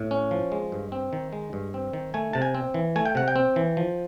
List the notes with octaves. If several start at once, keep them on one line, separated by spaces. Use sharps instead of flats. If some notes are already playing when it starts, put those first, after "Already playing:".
Already playing: A2
C#4
F3
G#3
G2
C4
D#3
G#3
G2
C4
D#3
A3 G#5
C3 A5
G#5
C4
E3
A3 G#5
G5
C3 F#5
G5
C4
E3
F3